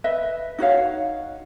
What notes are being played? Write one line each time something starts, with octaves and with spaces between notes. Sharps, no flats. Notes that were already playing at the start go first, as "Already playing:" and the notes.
B4 D#5 E5
D#4 F#4 C#5 F5